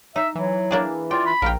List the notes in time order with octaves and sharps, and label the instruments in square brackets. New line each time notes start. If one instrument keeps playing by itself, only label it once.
[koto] D#4 [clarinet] E5
[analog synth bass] E3 [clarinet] F#3
[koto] A#3 D4 G#4
[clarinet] F4 [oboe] D5 [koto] G5
[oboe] B5
[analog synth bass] A#1 [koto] A#4 G5 [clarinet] F5